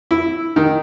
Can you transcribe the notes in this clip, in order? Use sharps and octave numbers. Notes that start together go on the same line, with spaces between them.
E4
D#3